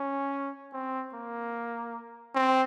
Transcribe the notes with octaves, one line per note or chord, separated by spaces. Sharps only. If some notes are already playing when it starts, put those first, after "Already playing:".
Already playing: C#4
C4
A#3
C4